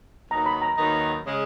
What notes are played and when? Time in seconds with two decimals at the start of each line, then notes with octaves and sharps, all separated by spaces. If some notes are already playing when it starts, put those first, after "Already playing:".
0.31 D#2 D#3 F#3 B3 D#4 A#5
0.46 B5
0.62 A#5
0.77 D#2 D#3 F#3 B3 D#4
1.25 C#3 G#3